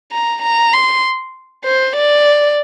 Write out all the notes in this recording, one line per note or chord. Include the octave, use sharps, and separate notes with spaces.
A#5
A#5
C6
C5
D5